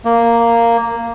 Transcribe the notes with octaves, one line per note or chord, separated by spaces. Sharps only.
A#3